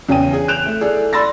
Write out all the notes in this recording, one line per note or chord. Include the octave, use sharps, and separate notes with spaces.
E2 C#3 C#4 G5 D#7
G#4
F#6 G6 D7 E7 F7
A3
E4 G#4 A4 D5
D5 B5 C6 E6 A6 A#6